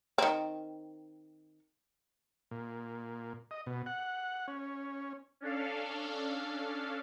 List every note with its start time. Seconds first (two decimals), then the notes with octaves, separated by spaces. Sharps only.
0.18 D#3 C4
2.51 A#2
3.51 D#5
3.66 B2
3.86 F#5
4.48 C#4
5.41 C#4 D4 A4 F5